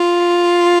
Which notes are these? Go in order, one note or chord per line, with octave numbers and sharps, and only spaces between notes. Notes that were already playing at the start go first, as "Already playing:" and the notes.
Already playing: F4